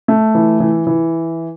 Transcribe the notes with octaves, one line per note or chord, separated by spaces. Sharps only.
A3
E3
E3
E3